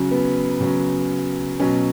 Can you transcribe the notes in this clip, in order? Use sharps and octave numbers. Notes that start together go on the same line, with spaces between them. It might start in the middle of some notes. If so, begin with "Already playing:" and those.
Already playing: C#3 F#3
B3
C#3 F#3
B2 F#3 C#4